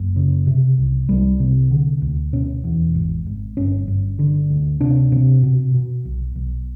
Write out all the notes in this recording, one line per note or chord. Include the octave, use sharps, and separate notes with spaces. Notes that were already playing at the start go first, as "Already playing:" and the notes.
Already playing: F#1
C#3
C3
C2
C2 G3
C3
D3
D2
B2 C#4
E2
G#1
G#1
G1 C#4
G1
D3
D2
C3 D4
C3
B2
B2
B1
B1